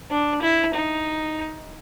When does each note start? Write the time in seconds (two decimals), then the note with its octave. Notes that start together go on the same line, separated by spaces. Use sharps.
0.11 D4
0.42 E4
0.74 D#4